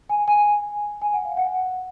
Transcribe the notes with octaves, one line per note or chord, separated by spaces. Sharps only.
G#5
G#5
G#5
F#5
F5
F#5